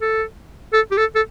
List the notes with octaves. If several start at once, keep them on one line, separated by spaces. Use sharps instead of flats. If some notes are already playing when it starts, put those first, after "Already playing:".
A4
A4
G4
A4
A4